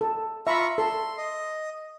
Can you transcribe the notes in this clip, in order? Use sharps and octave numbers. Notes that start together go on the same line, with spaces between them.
A4
F4 E5 A#5 B5 C#6
A4 C6
D#5